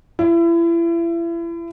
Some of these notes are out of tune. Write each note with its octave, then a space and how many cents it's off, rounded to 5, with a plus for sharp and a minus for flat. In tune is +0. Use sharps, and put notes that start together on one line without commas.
E4 +35